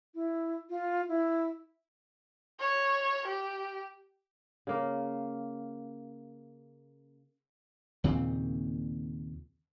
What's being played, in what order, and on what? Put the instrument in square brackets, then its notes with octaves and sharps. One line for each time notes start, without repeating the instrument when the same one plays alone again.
[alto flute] E4
F4
E4
[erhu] C#5
G4
[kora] C#3 A#3
[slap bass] D#2 A#2 C#3 C4